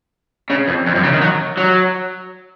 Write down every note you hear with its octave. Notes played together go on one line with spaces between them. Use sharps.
C#3
F2
F2
F#2
C#3
D#3
F#3
F#3